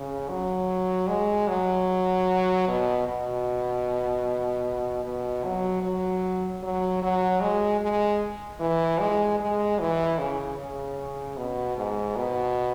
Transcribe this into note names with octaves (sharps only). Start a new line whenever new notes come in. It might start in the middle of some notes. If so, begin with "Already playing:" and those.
Already playing: C#3
F#3
G#3
F#3
B2
B2
B2
F#3
F#3
F#3
F#3
G#3
G#3
E3
G#3
G#3
E3
C#3
C#3
B2
G#2
B2